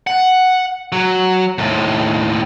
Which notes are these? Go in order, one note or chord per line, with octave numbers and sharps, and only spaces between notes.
F#5
F#3
D#2 A2